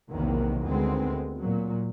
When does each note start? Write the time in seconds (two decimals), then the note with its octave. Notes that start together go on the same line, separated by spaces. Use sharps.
0.11 B1 E2 C3 D#3 A#3
0.66 D2 D#3 G#3 B3 C4
1.38 A#2 F#3